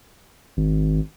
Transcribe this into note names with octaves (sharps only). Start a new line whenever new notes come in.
G#1